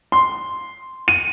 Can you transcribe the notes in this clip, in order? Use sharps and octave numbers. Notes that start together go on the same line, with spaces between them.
C6
D#7